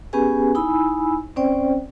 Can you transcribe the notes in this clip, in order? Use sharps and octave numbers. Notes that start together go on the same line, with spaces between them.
B3 C#4 G4 G#4 B4 G#5
D#4 E4 G#5 B5 E6
C4 C#4 C5 D5 G5